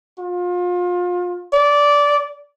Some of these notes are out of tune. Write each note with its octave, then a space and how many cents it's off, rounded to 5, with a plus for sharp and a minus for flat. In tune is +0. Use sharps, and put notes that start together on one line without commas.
F4 +30
D5 -15